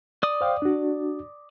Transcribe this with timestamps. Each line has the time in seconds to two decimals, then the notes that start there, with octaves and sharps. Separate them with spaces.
0.23 D5 D#6
0.41 C5 F5 G5
0.62 D4 F#4